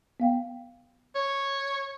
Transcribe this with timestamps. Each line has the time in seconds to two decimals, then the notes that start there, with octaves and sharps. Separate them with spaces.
0.20 B3 F5 G5
1.15 C#5